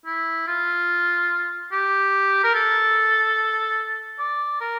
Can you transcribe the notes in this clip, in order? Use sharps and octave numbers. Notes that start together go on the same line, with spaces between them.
E4
F4
G4
A#4
A4
D5
A#4